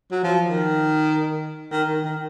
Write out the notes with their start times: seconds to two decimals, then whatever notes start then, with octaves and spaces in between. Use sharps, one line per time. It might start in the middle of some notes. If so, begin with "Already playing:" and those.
0.11 F#3
0.24 F3
0.49 D#3
1.72 D#3
1.88 D#3
2.04 D#3